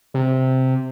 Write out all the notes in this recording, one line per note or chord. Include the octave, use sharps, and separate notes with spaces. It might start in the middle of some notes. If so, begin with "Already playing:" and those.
C3